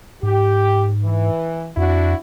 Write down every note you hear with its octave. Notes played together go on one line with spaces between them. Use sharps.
G#2 G4
E3
F2 D4 E4 F#4